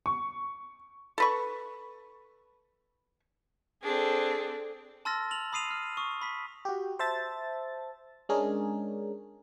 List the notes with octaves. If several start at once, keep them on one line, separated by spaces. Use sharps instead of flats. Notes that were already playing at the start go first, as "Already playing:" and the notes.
C#6
A4 B4 C#6
C4 D4 G#4 A4
A5 C6 E6 F6 A6 A#6
F7 F#7
B5 D#6 C7 D#7 F7
F6
C#6 D#6
B5 B6
F#4 G4
C5 E5 A5 A6
G#3 C#4 D4 G#4 A#4